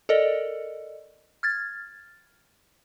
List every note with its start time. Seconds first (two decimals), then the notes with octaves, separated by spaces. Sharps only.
0.09 A4 A#4 D5 D#5
1.43 F6 G#6 A6